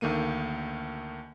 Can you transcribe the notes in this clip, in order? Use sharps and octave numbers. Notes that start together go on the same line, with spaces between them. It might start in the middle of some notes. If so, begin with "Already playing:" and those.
D2 D#3 A3 A#3 D#7